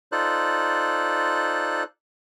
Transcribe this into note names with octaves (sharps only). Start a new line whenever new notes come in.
D#4 F4 A4 C5 D5 F#6